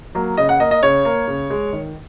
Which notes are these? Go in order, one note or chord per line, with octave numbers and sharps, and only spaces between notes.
F#3 A#3
C#3 D#5
F#5
A#3 D#5
D#5
C#3 C#5
A#3
C#3
G#3
D#3